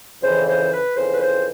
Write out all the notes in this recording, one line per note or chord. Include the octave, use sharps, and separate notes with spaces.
F2 C#3 E3 C5
C5
B4
F2 C#3 E3 C5
B4
C5